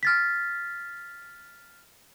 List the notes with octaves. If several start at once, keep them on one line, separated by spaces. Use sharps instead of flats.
F6 A6 B6